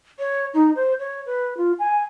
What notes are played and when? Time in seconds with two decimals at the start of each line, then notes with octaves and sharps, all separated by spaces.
0.19 C#5
0.54 D#4
0.76 C5
0.99 C#5
1.26 B4
1.57 F4
1.79 G#5